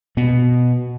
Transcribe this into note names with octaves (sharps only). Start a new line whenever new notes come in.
B2 B3